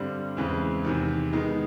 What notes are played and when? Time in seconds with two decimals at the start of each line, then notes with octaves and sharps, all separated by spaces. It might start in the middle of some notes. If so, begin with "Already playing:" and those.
Already playing: G2 D3 G3 C4
0.37 E2 C#3 E3 G#3 C4
0.85 E2 C3 D#3
1.33 D#3 G#3 B3 D#4